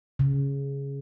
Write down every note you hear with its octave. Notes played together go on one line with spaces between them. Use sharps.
C#3